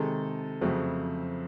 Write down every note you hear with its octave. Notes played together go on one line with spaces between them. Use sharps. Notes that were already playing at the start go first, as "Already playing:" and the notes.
Already playing: C3 D#3 G#3 A4
F2 C#3 F#3 A3 C4